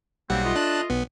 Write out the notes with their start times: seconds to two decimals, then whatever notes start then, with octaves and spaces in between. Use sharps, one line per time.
0.30 B1 C3 G3 A#3 C4 F#5
0.44 A3 F4 D#5
0.55 D4 A5 F#6
0.90 B1 B3